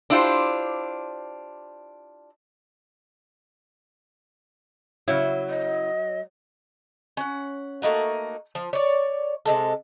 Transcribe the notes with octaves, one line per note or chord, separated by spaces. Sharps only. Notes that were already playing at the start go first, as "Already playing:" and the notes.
D4 E4 F4 G4 C5
C#3 F#3 E4
D#5
C#4 F#5
A3 A#3 D#4 F#4
F3
C#5 D5
C3 G#3 A4